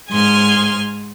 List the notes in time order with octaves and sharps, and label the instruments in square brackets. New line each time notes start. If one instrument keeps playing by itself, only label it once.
[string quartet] G#2 G#5 C6 F6